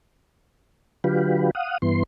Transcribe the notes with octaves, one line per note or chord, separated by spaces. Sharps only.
D3 F#3 F4 G4 B4
F5 F#5 D#6
G2 E3 B3 C6